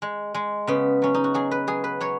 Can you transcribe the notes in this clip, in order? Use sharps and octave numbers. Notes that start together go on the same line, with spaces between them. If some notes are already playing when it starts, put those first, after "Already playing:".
G#3
G#3
C#3 B3
F#3 C#4
D#4
F#4
F#3 G#4
B4
F#3 G#4
B4
F#3 C#5